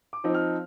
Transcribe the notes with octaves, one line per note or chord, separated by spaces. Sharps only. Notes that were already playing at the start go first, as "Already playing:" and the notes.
D6
F3 C4 D#4
F6